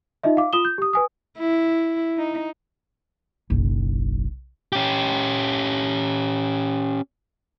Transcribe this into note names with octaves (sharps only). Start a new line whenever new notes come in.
D#4 F4 D#5 E5
F5 D6
F4 D#6 E7 G7
G6
G4 D#6
B4 G#5 D#6
E4
D#4
F#1 B1
C#4 G4